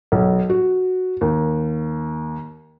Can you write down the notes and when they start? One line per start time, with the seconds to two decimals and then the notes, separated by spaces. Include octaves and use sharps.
0.12 B1
0.50 F#4
1.21 D#2